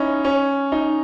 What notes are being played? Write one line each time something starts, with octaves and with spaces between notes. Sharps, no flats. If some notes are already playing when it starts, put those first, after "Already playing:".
Already playing: C#4 D#4 E4
C#4
D#4